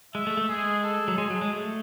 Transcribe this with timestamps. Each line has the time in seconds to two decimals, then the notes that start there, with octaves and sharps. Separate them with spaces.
0.15 G#3 E5
0.27 A3
0.37 A3
0.49 G#3 G#4
0.83 A4
1.08 F#3
1.18 G#3 G#4
1.30 F#3
1.41 G#3
1.53 A3